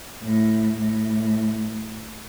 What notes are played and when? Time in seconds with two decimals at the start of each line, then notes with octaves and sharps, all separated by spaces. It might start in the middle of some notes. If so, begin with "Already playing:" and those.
0.23 A2
0.79 A2